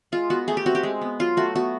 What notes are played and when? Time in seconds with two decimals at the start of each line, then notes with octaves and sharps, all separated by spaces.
0.12 G#3 F4
0.30 B3 F#4
0.48 A3 G#4
0.57 G4
0.66 C4 F#4
0.75 G4
0.83 G#3
1.01 B3
1.19 F#3 F4
1.37 A3 F#4
1.55 B3 F#4